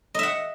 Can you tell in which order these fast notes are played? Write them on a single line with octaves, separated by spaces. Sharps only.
D#5 E5 F#5